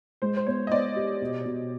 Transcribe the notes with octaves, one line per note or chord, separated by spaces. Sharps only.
G#3 C5
C5
B3 C#5
D#5
B3 D5
G4
B2
B2